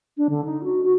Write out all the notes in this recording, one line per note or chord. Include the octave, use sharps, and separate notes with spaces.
D4
D3
D#4
F#4
F#4